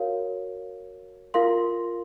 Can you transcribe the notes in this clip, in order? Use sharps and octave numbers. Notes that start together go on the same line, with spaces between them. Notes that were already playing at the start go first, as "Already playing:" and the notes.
Already playing: F#4 A#4 C#5 F5
F4 A#4 F5 C6